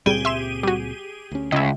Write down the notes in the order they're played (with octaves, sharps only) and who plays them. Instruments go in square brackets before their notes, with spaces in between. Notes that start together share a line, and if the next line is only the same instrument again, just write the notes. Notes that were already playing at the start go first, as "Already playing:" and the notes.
[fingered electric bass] C#2 A#2 C4 [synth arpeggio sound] G3 [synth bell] G4 G#4 D#7
[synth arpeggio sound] E5 C6 E7
G3 F#4
[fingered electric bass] D2 C#4
[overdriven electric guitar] C#2 [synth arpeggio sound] D#5 E5